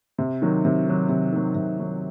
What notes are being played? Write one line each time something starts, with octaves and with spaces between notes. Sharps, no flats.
C3
D#3 F#3
C3
D#3 F#3
C3
D#3 F#3
C3
D#3 F#3